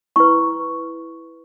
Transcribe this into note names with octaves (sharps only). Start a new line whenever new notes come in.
E4 B4 C#6